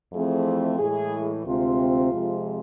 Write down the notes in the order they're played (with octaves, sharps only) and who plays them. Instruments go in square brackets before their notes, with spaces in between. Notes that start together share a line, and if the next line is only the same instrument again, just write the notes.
[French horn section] F2 E3 A3 C4 G#4
A2 E3 G#3 G#4
D2 C3 G#3 C4 F4
F2 C3 G#3